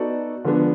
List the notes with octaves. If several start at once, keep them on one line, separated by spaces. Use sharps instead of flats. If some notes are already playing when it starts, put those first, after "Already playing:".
Already playing: B3 D#4 F#4 A4 D5
D3 F3 G#3 B3 D4